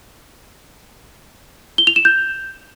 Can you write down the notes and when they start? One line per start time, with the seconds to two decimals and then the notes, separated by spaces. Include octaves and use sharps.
1.78 G7
1.87 F7
1.96 E7
2.05 G6